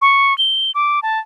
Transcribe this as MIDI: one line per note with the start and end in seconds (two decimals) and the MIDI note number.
0.02 0.36 85
0.38 0.71 103
0.75 1.00 86
1.03 1.19 81